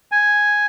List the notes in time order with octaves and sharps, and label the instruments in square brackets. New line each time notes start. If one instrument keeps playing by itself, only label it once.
[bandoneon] G#5